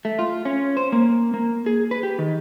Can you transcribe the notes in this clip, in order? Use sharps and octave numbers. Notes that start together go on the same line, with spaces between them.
A3
F4
C#4
C5
A#3
A#3
G#4
B4
G4
D#3